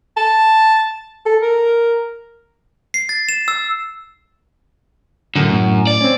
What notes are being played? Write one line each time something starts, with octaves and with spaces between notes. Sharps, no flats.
A5
A4
A#4
C7
A6
E7
E6
F#2 A2 D3
A2
D5
C4 C#4